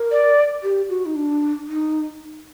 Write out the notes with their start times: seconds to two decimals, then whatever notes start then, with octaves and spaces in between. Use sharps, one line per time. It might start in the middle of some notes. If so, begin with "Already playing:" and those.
Already playing: A#4
0.11 D5
0.63 G4
0.89 F#4
1.06 D#4
1.15 D4
1.68 D#4